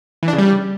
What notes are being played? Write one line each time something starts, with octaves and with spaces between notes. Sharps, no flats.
E3
D4
C#3
G3